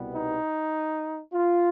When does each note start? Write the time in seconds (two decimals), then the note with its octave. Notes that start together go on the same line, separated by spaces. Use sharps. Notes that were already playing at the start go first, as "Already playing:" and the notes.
Already playing: C2 B2 G3 B3
0.14 D#4
1.33 F4